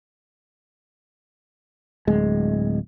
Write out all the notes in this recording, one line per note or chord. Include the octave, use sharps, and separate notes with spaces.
D1 G#3